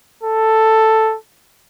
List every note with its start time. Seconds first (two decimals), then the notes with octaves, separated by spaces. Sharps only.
0.23 A4